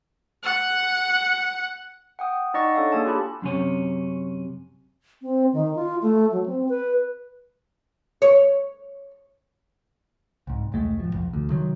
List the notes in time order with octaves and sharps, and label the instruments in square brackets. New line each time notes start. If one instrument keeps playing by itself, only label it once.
[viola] F#5
[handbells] F#5 G5 D#6
G5
D#4 D5 D#5 F#5 C#6 A6
D4 A4 C#5 D5 F5
A#3 G#4 F5 G#5 A5
F4 G4 B5
[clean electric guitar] F#2 C3 C#4
[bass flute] C4
D#3
F4
A3
F#3
C4
B4
[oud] C#5
[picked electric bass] C2 G#2
E1 C2 G#3 A3
G#1 F3
B1 F2
D2
C3 D#3 F#3